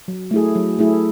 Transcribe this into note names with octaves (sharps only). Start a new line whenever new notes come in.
F#3
A3 E4 G#4
F#3
A3 E4 G#4